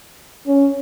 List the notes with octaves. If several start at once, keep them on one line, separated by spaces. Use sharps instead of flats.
C#4